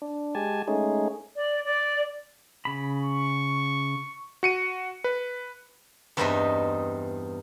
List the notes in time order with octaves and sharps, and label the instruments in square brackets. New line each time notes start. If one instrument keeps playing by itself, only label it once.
[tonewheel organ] D4
G#3 G4 G#5 A5
G#3 A3 C#4 D#4 G#4
[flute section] D5
D5
[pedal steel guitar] C#3 B5
[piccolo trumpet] C#6
[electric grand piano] F#4 C#7 D#7
B4
[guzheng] E2 G2 C4 D#4 D#5 E5